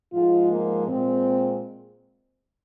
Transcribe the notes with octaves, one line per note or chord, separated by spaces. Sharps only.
G#2 F3 G#3 F4
A#3
A#2 G#3 C4